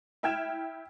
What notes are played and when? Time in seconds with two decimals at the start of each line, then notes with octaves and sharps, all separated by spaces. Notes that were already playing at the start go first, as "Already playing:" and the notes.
0.23 E4 E5 G5 F6 G#6 E7